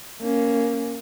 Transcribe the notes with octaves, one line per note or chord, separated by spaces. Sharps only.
A#3 C#4